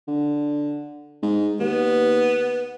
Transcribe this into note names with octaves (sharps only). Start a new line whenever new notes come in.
D3
G#2
D#2 B3